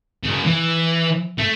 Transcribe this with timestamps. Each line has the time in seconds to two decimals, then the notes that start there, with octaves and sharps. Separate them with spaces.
0.23 F#2 C#3
0.44 E3
1.38 A3